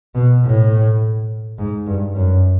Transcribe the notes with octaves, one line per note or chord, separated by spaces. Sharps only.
B2
A2
G#2
G2
F#2